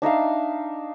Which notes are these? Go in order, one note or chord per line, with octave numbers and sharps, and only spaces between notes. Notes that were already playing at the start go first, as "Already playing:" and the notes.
D4 D#4 E5 F5